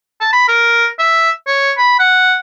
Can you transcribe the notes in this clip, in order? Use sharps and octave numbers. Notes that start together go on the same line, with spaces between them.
A5
B5
A#4
E5
C#5
B5
F#5